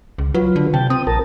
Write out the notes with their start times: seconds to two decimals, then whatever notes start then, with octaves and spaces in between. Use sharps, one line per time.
0.18 C#2
0.34 F#3 F4 B4
0.56 D3
0.74 C3 G5 A5
0.90 C4 D#6
1.07 A#1 A#4 A5